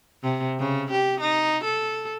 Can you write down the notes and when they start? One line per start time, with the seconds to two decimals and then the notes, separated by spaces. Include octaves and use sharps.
0.23 C3
0.59 C#3
0.91 G4
1.21 D#4
1.64 A4